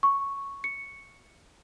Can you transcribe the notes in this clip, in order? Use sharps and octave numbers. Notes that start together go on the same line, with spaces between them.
C#6
C#7